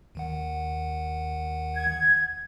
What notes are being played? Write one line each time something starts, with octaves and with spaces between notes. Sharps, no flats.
D#2 D#3 F#5
G#6